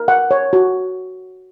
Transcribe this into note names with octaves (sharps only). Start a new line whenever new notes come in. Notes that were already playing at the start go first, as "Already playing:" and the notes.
Already playing: A#4
F#5
C#5
F#4